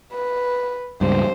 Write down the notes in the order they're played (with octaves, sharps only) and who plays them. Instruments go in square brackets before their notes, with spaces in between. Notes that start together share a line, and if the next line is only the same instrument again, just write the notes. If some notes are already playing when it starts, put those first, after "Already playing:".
[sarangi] B4
[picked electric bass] C#2 G2 [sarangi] C5